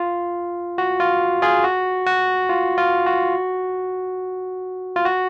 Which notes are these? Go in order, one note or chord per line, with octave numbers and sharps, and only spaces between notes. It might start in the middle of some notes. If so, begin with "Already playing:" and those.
Already playing: F4
F#4
F4
F4 G#4
F#4
F#4
F4
F4
F#4
F4
F#4